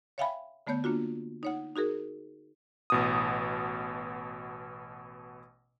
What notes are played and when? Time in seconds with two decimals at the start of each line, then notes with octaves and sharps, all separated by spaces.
0.18 C#5 E5 F5 G5 G#5 B5
0.67 D3 A3 B3 C#5 G6
0.84 A#3 D4 F4 F#4
1.43 D#4 C#5 F#5
1.76 D#4 F#4 G#4 A#4
2.90 A1 B2 D#6